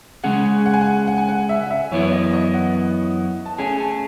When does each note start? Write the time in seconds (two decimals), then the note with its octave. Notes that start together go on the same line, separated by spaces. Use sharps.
0.24 C#3 G#3 C#4 G#4 F#5
0.66 F#5
0.74 G#5
0.81 F#5
1.08 F#5
1.18 G#5
1.28 F#5
1.49 E5
1.63 F#5
1.71 E5
1.91 F#2 E3 B3 E4 C#5
2.08 C#5
2.12 D#5
2.33 D#5
2.54 F#5
3.46 A5
3.58 A3 C#4 G#4 G#5
3.80 A5